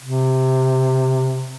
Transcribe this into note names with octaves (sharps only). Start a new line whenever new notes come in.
C3